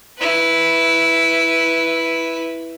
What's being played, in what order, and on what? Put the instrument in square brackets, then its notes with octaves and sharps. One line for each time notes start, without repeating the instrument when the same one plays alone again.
[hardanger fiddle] E4 B4